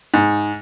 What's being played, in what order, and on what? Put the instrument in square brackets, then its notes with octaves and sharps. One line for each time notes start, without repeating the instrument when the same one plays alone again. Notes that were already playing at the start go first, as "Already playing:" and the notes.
[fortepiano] G#2